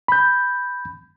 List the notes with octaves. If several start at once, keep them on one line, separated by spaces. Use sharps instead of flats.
B5 G6